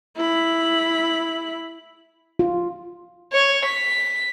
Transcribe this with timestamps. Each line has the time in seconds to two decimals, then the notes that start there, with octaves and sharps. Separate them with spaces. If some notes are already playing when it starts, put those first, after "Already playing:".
0.17 E4 B5
2.39 F4
3.33 C#5
3.65 B6